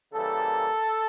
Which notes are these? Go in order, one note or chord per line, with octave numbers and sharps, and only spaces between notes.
C#3 E3 G3 A#3 A4